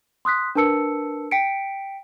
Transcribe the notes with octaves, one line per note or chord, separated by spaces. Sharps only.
C6 D#6 F#6 B6
D4 A#4 B4 A5 E6 C#7
G5 B6 C#7 D7